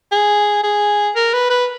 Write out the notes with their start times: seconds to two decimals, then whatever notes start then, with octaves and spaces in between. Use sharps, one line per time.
0.12 G#4
0.64 G#4
1.16 A#4
1.33 B4
1.50 B4